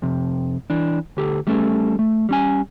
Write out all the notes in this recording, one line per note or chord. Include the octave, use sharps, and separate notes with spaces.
F2 C3
E3 D4
D2 G4 A4
G3 A3 C#4 A4
A3
G3 C#4 G#5